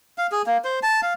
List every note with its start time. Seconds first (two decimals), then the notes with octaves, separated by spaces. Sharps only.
0.18 F5
0.32 G#4
0.47 A#3
0.65 C5
0.83 A5
1.02 F5